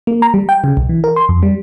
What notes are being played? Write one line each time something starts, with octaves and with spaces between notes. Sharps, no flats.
A#3
A#5
G3
G5
C#3
B1
E3
A#4
C6
F2
G3